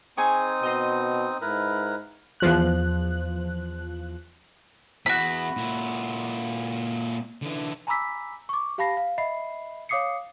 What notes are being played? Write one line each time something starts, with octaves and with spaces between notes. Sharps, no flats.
C4 D#4 G#4 G#5 C#6 D#6
B2 D#5 A#5 C6
G#2 E4 A#4 B4
E2 F3 F#6
E2 F#4 B5
A#2 E4
D3 E3
G#5 A#5 B5 D6 E6 B6
C#6 D6
G4 F5 A5 B5 A#6 C7
F5
D#5 E5 B5 C7
C#5 F5 D6 D#6 C7 C#7